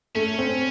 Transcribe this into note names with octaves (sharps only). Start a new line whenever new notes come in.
A3 C#4
C4